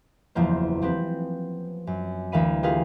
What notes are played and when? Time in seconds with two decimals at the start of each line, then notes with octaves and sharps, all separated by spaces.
0.35 F#1 E2 F3 A3 A#3 C5
0.82 F3 C4 G4 B4
1.87 F#2
2.32 D2 E3 A#4 F5 B5 D#7
2.63 F4 G4 G#4 A#4 B4 F5